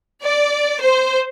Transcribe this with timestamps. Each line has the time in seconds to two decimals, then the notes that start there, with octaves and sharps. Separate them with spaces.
0.23 D5
0.81 C5